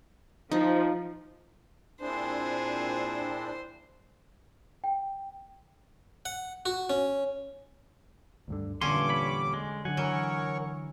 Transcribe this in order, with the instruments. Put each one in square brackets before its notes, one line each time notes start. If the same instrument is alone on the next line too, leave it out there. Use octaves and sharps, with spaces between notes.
[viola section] F3 [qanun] D#4
[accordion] A#2 C4 D4 [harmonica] E4 G#4 [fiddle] C5
[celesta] G5
[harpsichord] F#5
F#4
C#4
[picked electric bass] D2 G2 D3
[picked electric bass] E2 A#2 [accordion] G2 D6 [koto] D3 C#4 [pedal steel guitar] C6
[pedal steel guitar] C#5 B5
G#3
[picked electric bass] D3 F#3 [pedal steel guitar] F#5 G#5
[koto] E3 [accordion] A#4 C#5 C#6